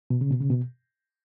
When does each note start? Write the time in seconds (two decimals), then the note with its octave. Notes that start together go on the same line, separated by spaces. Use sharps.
0.10 B2
0.21 C#3
0.30 B2
0.41 C#3
0.50 B2